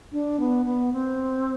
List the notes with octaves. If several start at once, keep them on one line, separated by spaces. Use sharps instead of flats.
D4
B3
B3
C4